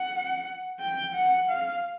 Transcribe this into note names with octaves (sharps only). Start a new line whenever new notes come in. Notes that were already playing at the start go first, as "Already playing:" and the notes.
Already playing: F#5
G5
F#5
F5